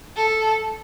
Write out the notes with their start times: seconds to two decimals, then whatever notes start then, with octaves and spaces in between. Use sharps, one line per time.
0.16 A4